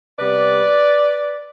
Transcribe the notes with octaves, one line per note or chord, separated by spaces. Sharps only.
C3 G3 B3 B4 D5